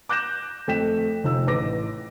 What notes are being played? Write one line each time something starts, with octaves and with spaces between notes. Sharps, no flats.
D6 F#6 G6 A#6 E7
F2 A3 G5 B6 E7
F1 D#4 F4 E6
A1 B4 D6 A#6